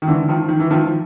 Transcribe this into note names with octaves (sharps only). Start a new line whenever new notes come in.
D#3
D3 E3
D#3 F3
D#3
E3
D#3 F3